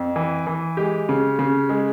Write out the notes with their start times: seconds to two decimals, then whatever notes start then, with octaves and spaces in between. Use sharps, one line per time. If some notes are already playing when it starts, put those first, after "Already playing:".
Already playing: F2
0.16 E3
0.47 E3
0.77 G#3 G4
1.09 C#3
1.39 C#3
1.69 G#3